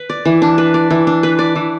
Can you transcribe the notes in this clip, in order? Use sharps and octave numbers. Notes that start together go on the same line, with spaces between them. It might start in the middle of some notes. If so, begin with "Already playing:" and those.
Already playing: B4
D5
E3
D4
B4
D5
E3
D4
B4
D5
E3